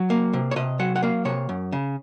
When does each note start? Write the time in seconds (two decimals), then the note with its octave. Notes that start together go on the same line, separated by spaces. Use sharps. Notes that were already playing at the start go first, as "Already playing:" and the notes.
Already playing: F#3
0.10 A#3
0.33 C3
0.51 C#5
0.56 C3 D#5
0.79 F#3 F#5
0.96 F#5
1.02 A#3 F5
1.25 C3 C#5
1.49 F#2
1.72 C#3